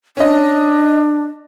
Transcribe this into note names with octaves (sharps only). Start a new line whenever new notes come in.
C#4 D4 D#5